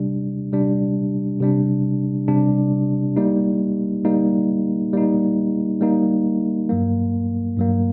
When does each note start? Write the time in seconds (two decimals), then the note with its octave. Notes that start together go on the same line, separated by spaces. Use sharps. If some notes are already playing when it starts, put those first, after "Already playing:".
Already playing: C3 G3 D4
0.52 C3 G3 D4
1.40 C3 G3 D4
2.28 C3 G3 D4
3.16 G3 A#3 D#4
4.05 G3 A#3 D#4
4.93 G3 A#3 D#4
5.81 G3 A#3 D#4
6.69 G2 F#3 A#3
7.57 G2 F#3 A#3